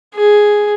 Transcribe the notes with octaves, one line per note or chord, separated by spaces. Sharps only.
G#4